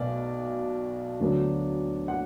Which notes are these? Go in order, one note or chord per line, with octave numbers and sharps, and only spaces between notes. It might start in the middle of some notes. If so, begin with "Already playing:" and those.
Already playing: B1 B2 B3 D5
D2 D3 F#3 B3 D4
F#5